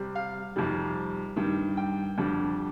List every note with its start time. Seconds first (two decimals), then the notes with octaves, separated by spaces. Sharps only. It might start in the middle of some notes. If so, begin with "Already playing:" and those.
Already playing: C3 G3
0.15 F5
0.56 F2 C3 D#3 G3
1.36 G2 D#3 G3
1.77 G5
2.18 F2 D3 G3